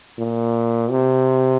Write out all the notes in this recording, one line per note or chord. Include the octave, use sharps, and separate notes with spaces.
A#2
C3